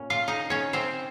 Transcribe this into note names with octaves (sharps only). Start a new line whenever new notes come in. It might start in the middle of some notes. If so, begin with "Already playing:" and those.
Already playing: A#2 C#4
F4 F5
D#4 D#5
C#4 C#5
C4 C5